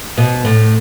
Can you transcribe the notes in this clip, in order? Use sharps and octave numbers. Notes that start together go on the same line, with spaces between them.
B2
A2